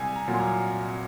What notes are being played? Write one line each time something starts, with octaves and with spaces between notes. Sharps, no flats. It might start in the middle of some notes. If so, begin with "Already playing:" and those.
Already playing: C2 G#5
A#5
A#2 F#3 A#3
C6
A#5